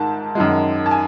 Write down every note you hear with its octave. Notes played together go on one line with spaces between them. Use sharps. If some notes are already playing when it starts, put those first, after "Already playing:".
Already playing: G#2 D#3 A5
F#2 D#3 G#3
A5
G#5